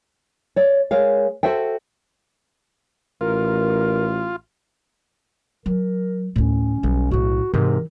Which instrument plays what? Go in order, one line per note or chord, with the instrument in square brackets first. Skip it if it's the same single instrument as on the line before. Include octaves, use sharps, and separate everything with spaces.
[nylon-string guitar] C#5 D5
G#3 A#4 C#5 F5
F#4 A4 C5 E5 G5
[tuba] A1 [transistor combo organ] F4 [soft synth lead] A#4
[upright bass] F#3 [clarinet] A#4
[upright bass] D2 A2 [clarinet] C#4
[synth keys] B1 [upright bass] G3
[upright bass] A2 E4 [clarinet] F#4
[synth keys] G#2 C3 [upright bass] E3 [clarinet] A#4